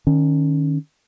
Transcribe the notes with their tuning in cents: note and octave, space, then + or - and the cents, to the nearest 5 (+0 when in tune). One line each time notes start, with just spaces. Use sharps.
D#3 -20 C#4 +0